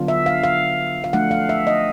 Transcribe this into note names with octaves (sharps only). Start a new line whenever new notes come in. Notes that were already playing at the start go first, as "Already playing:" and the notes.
Already playing: D3 F#3 B3 D4 F4
E5
F5
F5
F5
F3 A3 D4 F#5
F5
E5
D#5